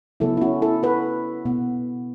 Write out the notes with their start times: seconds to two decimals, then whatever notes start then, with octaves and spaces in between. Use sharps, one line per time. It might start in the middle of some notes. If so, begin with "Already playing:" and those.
0.20 C#3 F#3 B3 E4 A4
0.37 E4
0.41 C#4 F#4
0.62 E4 A4
0.83 F#4 B4
1.45 B2 B3